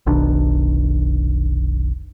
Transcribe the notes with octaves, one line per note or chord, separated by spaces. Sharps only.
F1 B1 D#3 D4